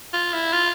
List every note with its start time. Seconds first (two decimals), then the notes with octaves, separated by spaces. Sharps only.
0.13 F4
0.33 E4
0.53 F4